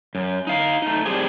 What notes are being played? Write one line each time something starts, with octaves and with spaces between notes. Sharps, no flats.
F#2
D#4 F5
A3 D#4
G3 C4 D4 G4 G#4